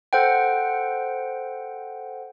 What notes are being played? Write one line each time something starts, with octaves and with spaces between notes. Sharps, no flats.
A4 C5 F#5 G5